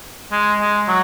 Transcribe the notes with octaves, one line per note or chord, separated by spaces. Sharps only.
G#3
G#3
F#3